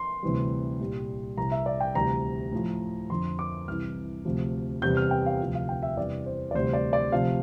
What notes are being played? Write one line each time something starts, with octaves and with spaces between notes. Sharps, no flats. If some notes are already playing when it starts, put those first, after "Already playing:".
Already playing: C6
D2 C3 E3 G3
C2 A#2 G3
C2 C3 G3 A#5
E5
D5
G5
D2 C3 E3 G3 A#5
A2 F3
F2 D3 F3 C6
D6
C2 C3 E3 F6
D2 C3 F3
E2 C3 E3 G3 G6
F6
G5
F5
D2 C3 F3
F5
G5
E5
E2 C3 E3 G3 D5
C5
D5
D2 C3 E3 G3 C5
D5
D5
D2 C3 F3 F5